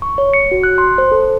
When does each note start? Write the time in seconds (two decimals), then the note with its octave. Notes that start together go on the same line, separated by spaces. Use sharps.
0.02 C#6
0.18 C#5
0.34 C#7
0.51 F#4
0.63 F#6
0.78 C6
0.98 C5
1.12 A4